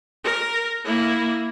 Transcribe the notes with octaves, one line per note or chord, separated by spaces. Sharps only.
A#4
A#3 E4